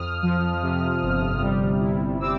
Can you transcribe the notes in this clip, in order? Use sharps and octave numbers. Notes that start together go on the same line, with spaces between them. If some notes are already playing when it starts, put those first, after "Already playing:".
Already playing: F2 D#6 F6
F3
C3
G1
G3
E4
C4 D6 E6